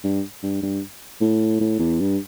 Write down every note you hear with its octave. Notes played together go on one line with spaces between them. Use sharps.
G2
G2
G2
A2
A2
E2
G2